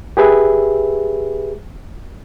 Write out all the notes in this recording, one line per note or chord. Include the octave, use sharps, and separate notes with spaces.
G4 G#4 B4 E5